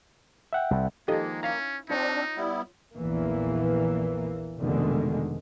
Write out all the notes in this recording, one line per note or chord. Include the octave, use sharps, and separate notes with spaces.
E5 F#5 G5
C2
D#3 F3 G#3 A#3 G4 A4 D#5
C#4 E4 F5 A#5
C4 D4 D#4 F4 C#5
G3 B3 E4
A#1 E2 E3 A#3
F1 B2 D3 D#3 G#3